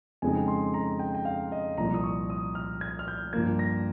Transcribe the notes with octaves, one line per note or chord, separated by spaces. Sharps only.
F2 C#3 G#3 C4 D#4 G#5
C6
A#5
G5
G5
F5
D#5
C2 A#2 F3 A#5
D#6
C#6
D#6
F6
G#6
F6
G6
G2 F3 A#3 G#6
A#6